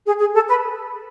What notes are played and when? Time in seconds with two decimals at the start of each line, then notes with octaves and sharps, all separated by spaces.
0.06 G#4
0.20 G#4
0.34 A4
0.48 B4